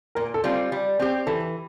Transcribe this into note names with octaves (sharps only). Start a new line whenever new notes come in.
A#2 A#4
A4
G3 C4 F4
G3
C4 G4
E3 A4